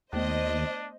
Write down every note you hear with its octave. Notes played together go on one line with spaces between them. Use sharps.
D#2 A3 B3 D4 C5 D#5